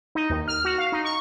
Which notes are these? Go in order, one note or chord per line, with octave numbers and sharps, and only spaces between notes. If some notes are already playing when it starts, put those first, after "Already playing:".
D#4
D#2
F6
F#4
F5
D#4
C#6